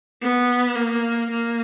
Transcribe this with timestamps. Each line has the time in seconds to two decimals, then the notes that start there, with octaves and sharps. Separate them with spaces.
0.22 B3
0.76 A#3
1.30 A#3